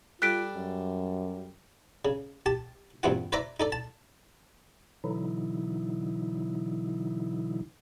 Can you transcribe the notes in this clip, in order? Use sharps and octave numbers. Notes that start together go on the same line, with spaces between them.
G3 F4 A4 D5 F#6 B6 D7
F#2
C#3
G4 A5
A#1 E2 G2 C4 F4 F#5
B4 C5 D5 E5 A#5 D6
D#4 A4 D5
A5
B2 D3 E3 F#3 D#4 E4